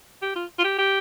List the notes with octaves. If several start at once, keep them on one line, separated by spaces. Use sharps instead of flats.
G4
F4
F4
G4
G4